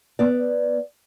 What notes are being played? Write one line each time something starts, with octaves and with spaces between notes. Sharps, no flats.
B3 D5